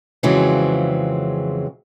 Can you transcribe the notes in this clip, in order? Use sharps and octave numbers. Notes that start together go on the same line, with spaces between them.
F2 C#3 E3 F#3 G#3 C4